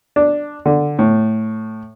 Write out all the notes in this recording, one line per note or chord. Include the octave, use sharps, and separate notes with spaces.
D4
D3
A2